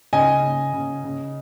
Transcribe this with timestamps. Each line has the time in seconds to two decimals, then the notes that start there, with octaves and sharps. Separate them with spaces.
0.13 C#3 D#5 G#5
0.43 C#3
0.73 C#3
1.04 C#3